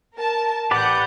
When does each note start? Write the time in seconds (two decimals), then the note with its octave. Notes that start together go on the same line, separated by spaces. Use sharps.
0.14 A#4 A5
0.71 A1 G4 B4 D5 F#5 G6